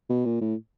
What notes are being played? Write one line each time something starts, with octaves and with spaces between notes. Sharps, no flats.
B2
A#2
A2